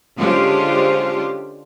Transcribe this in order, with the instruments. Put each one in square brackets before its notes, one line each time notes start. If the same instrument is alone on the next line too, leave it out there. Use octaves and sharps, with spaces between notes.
[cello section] D3 G#3 C#4 F4 G4 C5